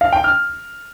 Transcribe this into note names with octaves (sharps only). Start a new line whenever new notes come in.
F5
G5
F6